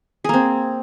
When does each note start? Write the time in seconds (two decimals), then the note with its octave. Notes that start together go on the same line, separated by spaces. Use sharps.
0.24 G#4
0.29 A#3
0.34 C4